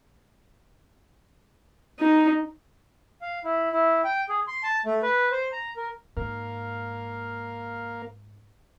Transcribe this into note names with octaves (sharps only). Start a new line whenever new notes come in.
D#4
F5
E4
E4
G5
G#4
C6
A5
A3
B4
C5
A#5
A#4
G#2 A#3 A#4 F5